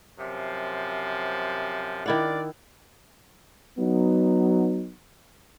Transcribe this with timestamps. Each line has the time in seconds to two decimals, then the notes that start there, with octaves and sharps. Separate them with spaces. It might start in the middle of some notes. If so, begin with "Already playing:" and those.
0.18 F#2 C3 F3
2.06 D#3 D4 E4 F4 D5 F#5
3.78 F#3 B3 D#4